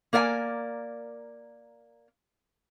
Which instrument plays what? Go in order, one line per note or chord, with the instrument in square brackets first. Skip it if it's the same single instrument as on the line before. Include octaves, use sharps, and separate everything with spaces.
[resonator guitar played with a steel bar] A#3 A#4 D5 F5 G#5